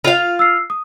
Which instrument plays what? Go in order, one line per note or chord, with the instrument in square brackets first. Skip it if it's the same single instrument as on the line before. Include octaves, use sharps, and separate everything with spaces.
[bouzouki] F4 F5
[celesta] E6 C7
D#6